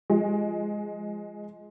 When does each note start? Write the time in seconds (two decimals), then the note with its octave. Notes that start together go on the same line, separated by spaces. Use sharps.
0.10 F3 G#3